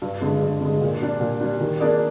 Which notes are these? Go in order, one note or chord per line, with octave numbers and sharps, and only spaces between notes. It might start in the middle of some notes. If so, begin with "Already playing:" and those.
G2
D3 G#3
G2
D3 G#3
A#2
G3 D4
A#2
G3 D4
D#3
A#3 D4 G#4 D5